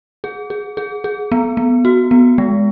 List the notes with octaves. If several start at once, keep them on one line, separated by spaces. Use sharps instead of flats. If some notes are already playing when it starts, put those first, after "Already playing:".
G#4
G#4
G#4
G#4
B3
B3
F#4
B3
G#3